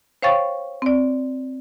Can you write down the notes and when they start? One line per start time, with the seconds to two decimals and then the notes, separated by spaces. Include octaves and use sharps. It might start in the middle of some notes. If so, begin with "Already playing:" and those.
0.22 C5 C#5 F5 G5 C#6 A6
0.82 C4 D5